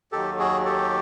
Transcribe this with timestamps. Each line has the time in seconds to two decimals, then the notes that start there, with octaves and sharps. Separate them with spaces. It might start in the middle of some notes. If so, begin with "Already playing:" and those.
0.12 D#2 D#3 F#3 G4 A4
0.39 F#4 G#4
0.65 G4 A4